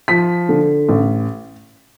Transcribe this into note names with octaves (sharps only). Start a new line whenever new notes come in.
F3 B6
D3
A1